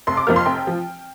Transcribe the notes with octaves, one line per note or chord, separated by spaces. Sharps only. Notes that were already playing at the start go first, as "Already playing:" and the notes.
F1 C6
D6
F2 F3 A#3 F6
C6
F1 G5
F3